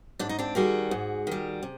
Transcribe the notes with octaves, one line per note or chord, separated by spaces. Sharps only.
G#2 D4
D#4
C4 D4
D#3 G3 F#4 G#4
G#2
D#3 G3
C3